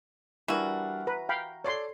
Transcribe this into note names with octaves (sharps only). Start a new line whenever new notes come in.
E3 G3 D4 F#4 A#4
B4 A#5
F5 G5 B5
A4 C#5 D5 C6 C7